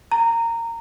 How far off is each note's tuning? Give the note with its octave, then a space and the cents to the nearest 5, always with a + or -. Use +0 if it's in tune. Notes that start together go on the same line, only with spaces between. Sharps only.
A#5 -15